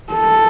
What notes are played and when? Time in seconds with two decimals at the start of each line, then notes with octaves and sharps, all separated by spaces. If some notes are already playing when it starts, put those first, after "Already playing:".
0.13 A4